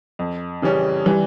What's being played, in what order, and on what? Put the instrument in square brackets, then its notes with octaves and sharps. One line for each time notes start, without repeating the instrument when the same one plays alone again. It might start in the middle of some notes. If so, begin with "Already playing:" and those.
[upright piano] F2
C#3 E3 G3 C#4
[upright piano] E3 [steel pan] G3